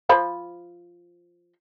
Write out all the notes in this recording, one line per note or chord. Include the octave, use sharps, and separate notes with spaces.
F3 C5 B5